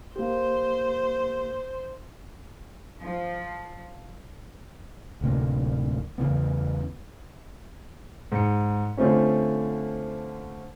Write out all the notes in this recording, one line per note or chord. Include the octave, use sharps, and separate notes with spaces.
A#3 G4 C5
F3
D1 D2 C3 A#3
E2 C#3 E3 B3
G#2 C#7
D3 F3 A3 C4 C#4